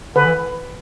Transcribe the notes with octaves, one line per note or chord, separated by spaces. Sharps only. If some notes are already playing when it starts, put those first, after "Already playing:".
D3 B4
E3